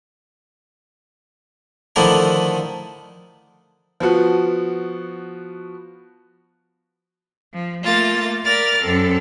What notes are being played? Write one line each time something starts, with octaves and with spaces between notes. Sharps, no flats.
D3 D#3 F3 A3 D4 E4
F3 B3 F#4
F3
A3 A#3 F4 A6
A#4 D5 B5 F6 A6
F#2 C4 A4